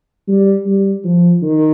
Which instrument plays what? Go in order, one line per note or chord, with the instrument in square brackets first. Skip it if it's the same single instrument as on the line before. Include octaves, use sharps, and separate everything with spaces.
[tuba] G3
G3
F3
D#3